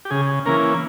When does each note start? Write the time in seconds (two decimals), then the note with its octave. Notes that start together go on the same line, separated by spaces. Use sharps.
0.05 G4
0.10 C#3 G#4
0.46 E3 A#3 C#4 A#4